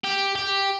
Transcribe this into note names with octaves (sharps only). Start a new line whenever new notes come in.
G4
G4